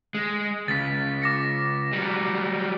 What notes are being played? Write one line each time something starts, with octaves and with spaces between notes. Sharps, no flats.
G#3
C#2 A6 B6
D6 A#6 C#7
F#3 G3